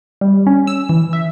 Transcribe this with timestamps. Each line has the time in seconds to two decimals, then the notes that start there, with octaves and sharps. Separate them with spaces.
0.21 G3
0.47 C#4
0.67 E6
0.89 E3
1.13 E5